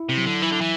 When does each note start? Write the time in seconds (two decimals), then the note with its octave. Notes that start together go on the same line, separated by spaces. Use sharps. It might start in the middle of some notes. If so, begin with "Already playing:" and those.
Already playing: E4
0.09 C3
0.17 F#3
0.26 D3
0.42 E3 E4
0.52 D3
0.61 E3